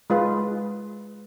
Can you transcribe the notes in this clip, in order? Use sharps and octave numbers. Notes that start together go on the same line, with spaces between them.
G#3 F4 B4